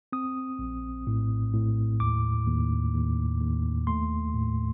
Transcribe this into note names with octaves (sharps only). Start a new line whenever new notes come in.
C4 D#6
A#1
A2
A2
D#2 D6
D#2
D#2
D#2
A3 C6
A2